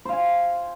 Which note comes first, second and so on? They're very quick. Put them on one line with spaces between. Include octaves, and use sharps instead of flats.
C5 F5 G#5